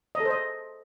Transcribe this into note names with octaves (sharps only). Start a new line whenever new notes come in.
D#5
A4
C5
D#5